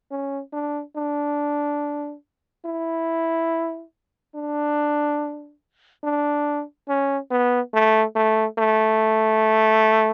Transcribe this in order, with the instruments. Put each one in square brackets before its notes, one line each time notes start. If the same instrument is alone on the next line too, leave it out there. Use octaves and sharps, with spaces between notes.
[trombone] C#4
D4
D4
E4
D4
D4
C#4
B3
A3
A3
A3